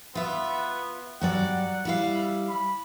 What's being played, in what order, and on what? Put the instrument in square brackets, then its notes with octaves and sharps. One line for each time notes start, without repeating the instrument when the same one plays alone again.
[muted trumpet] B3 [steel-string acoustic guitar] F4 E5
[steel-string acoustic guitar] G2 F#3 D5 [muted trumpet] F#5
[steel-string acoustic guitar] G3 E4 F5
[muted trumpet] B5